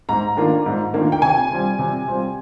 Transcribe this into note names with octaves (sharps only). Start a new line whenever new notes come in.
G#2 A#5
D#3 A#3 D4 F4
G#2
D#3 A#3 D4 F4
G5
C3 G#5
G3 C4 F4
C3
G3 C4 F4